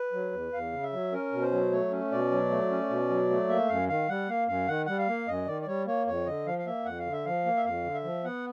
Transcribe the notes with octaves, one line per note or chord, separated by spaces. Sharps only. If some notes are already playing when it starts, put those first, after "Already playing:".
Already playing: B4
F#3
E2
E2 F5
C#3
E5
F#3
C#4 A#4
B2
C5
F#3
A3 C#5
C#4
B2 D5
F#3
A3
C#4
B2
F#3
A3
A#3 E5
F#2 F5
D#3 F5
G3 F#5
A#3 F5
F#2 F5
D#3 F#5
G3 F#5
F5
A#3
F#2 D#5
D#3 D5
D5
G3 C#5
A#3 C#5
F2 C#5
D3 D#5
F3 F5
F5
A#3 E5
F2 F#5
F5
D3
E5
F3 F5
A#3
E5
F2 F5
D3
E5
F3
B3 F#5